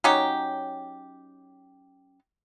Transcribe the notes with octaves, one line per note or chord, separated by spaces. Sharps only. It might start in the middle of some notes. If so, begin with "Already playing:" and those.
F#3 C#4 D#4 G4